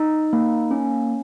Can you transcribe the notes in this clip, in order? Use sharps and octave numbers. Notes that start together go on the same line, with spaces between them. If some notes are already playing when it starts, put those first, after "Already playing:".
Already playing: D#4
A#3
C#4